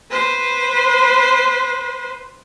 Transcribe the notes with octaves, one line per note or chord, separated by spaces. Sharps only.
B4 C5